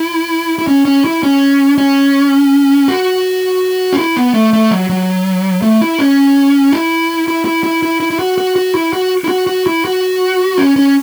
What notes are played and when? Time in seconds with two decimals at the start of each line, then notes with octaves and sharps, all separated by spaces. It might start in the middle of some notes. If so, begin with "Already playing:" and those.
Already playing: E4
0.59 E4
0.67 C#4
0.85 C#4
1.05 E4
1.23 C#4
1.78 C#4
2.88 F#4
3.93 C#4
3.98 E4
4.16 B3
4.34 A3
4.53 A3
4.71 F#3
4.90 F#3
5.62 A3
5.81 E4
5.99 C#4
6.72 E4
7.28 E4
7.45 E4
7.64 E4
7.83 E4
8.00 E4
8.11 E4
8.19 F#4
8.38 F#4
8.56 F#4
8.75 E4
8.93 F#4
9.24 E4
9.29 F#4
9.47 F#4
9.67 E4
9.85 F#4
10.57 C#4
10.76 C#4